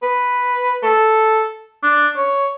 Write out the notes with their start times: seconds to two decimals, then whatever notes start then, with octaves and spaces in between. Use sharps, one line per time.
0.02 B4
0.83 A4
1.83 D4
2.16 C#5